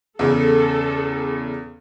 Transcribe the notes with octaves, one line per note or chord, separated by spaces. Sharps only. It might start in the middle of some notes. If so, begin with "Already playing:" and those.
E2 C#3 A4